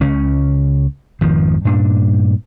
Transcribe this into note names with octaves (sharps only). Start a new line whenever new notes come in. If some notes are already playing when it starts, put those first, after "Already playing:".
C#2 C#3 C#4
G#1 F2 D#3 F3
G2 A#2 D4